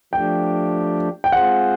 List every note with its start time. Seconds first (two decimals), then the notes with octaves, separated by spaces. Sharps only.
0.13 F3 A3 D4 G4 G5
1.24 G5
1.32 G#3 C4 F4 G#4 C5 F#5